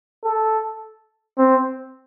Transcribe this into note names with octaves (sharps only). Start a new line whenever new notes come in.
A4
C4